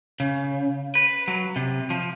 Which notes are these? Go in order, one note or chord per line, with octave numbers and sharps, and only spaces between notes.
C#3
B4
F#3
C3
F3